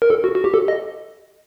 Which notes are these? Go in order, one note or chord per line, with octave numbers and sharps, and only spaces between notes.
A#4
A4
F#4
F#4
G4
A4
D#5